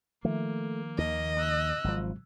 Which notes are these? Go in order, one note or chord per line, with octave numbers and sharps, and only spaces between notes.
D#3 F3 A3 A#3
D#2 D#5
E6 F#6
G#1 F3 F#3 G#3